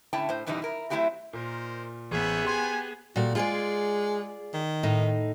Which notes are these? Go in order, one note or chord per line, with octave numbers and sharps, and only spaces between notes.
A2 D3 C#4 E4 G5 A5
A2 C5
F#2 B2 E3 G3 D#4
E4 A#4
F#3 A3 C4 E4 F#4 G4
A#2 D#4 A#4 C5
A1 B3 G#4 C5 C#5 E5
G4 C5 G#5 C6
A#2 G3 A3 F#4
G#3 F4 G#4 D5
D#3
A2 D#4